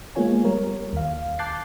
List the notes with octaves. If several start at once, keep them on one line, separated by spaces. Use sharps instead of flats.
G#3 A#3 B3 F4 C#5 G#5
G3 A#4 C#5
D#2 F5
A5 D6 F#6 G6 A6 C7